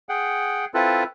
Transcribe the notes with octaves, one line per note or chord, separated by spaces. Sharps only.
G#4 F#5 G5
C4 E4 F4 A4 B4